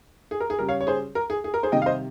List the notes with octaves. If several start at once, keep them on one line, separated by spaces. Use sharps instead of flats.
G#4
A#4
G#4
C#3 G3 A#4
C#5 F5
C#5
G#4 C5
A#4
G#4
G#4
A#4
G#4 C5
C3 D#3 G3 D#5 G5
F5
C5 D#5